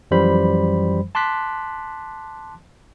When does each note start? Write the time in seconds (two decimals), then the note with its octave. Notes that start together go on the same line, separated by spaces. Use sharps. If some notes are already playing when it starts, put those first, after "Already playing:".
0.11 F#2 E3 F3 G3 C5 B5
1.15 A5 C6 D6 F#6 B6